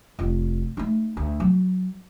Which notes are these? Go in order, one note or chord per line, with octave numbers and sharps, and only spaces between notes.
F1 F4
A3 D#4
D2
F#3